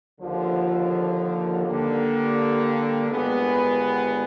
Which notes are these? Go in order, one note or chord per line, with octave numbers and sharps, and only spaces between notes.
D#2 D3 F3
D3 G3 A#3
G1 G2 D#3 G#3 B3